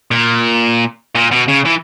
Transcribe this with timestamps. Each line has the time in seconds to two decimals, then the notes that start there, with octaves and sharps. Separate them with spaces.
0.11 A#2
1.15 A#2
1.31 B2
1.48 C#3
1.65 E3